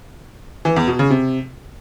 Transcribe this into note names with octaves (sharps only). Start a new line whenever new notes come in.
E3
E2
B2
C#3
C3